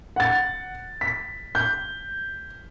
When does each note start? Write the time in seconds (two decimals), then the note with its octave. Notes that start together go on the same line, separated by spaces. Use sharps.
0.16 F#5 A6
1.01 B6
1.55 G6